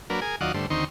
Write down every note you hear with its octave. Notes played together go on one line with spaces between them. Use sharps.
F#3 A#3 D4 A#4 B4
G#4 A#4 G#5
D#2 F#3 F4 D5 D#5 F#5
G2 D3 A3 C5
D2 D#3 C4 D#4 C6 C#6